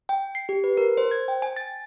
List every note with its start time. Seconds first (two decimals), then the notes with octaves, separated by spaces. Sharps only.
0.09 G5
0.35 C7
0.49 G4
0.64 B4
0.77 A#4
0.97 C5
1.11 G#6
1.28 G5
1.42 G#5
1.56 A6